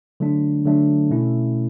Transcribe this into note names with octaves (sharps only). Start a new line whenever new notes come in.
D3 F#3 A3 D4
D3 F#3 A3 D4
B2 A3 C#4 E4